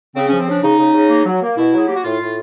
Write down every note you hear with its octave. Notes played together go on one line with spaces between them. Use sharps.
C#3 C4
C#4
F3
C4
C#3 D4
C#3 D#4
C#3
C#3
A#3
F#3
A#3
B2 E4
F#3 G#4
A#3 G4
F#4
A2 F4
A2